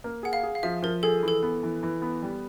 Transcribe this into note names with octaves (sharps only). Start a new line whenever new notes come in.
A#3
G#4 F#5
F5
G#4
F5
F3 E5
F3 A#4
G#4 A4
E3 A4
B3
E3
E3
B3
G3